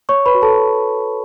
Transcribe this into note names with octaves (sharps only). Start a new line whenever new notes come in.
C#5 C#6
B4 B5
F#4
A4 A5